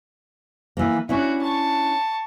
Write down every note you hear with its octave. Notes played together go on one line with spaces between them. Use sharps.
E3 A#3
C#4 D4 E4 F#4
A5 C#6